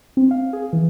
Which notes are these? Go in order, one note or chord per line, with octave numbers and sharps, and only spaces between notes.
C4
F5
G#4
E3